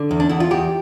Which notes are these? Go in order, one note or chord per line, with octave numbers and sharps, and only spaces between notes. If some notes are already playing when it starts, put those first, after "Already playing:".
Already playing: D3
E2
D4
E2 E4
F4
E2 G4